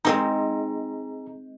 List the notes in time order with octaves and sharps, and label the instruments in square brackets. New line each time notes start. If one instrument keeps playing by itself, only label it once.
[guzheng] G#3 C4 D#4 [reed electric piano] G#4 A#5